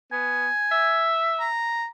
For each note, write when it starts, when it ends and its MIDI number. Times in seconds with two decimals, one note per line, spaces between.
0.12 0.48 59
0.12 1.07 80
0.72 1.46 76
1.39 1.86 82